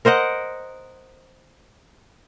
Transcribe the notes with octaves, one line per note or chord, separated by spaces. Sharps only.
A#4 C5 D#5 F#5